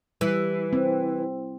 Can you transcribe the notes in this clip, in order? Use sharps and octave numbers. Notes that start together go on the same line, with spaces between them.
E3 G3
C4